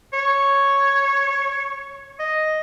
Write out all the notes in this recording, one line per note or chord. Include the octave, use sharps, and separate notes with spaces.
C#5
D#5